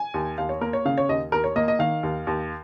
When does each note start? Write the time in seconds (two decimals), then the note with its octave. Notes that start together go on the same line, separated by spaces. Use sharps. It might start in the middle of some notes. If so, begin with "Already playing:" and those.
Already playing: G#5
0.14 D#2
0.38 D#2 F5
0.49 C#5
0.61 A#3 A#4
0.73 C#5
0.85 C#3 F5
0.97 C#5
1.09 D#2 D#5
1.32 D#2 A#4
1.44 C#5
1.56 A#3 D#5
1.68 D#5
1.79 D#3 F5
2.03 D#2
2.27 D#2